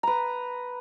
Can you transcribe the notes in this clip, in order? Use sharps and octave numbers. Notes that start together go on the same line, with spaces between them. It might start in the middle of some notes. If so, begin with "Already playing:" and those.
B4 A#5